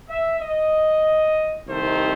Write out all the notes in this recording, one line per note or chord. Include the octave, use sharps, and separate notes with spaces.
E5
D#5
C2 C3 D#3 A3 D#4 C5